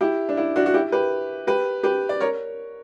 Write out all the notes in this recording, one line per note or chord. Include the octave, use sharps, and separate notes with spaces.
E4 G4
D4
E4
D4 F#4
F#4
E4 G4
G4 B4
G4 B4
G4 B4
D5
A#4 C#5